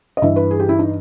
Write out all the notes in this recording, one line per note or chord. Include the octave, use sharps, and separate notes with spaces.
D#5
G2 E3 E5
B4
G#4
G4
E4
D#4